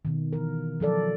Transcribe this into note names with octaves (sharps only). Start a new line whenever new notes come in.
B2 D#3
E3 A#4
F3 F#3 A4 D5